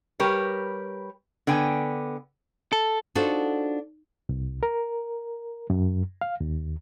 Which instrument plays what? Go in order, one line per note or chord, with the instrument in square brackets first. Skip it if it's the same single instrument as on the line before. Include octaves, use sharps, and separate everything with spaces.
[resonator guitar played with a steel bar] G3 G4 A#4 B4 C#5
D3 B3 G5 G#5
[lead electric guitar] A4
[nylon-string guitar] D4 D#4 F4 F#4 A4 C5
[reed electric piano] C2
A#4
F#2
F5
D#2